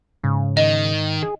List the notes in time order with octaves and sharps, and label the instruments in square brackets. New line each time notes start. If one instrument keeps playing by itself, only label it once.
[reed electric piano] G#2 [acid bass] C#3
[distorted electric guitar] D#3 [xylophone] D#5
[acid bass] G#4